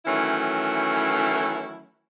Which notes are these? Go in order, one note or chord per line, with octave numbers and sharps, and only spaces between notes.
D#3 E3 F#3 A3 C#4 E4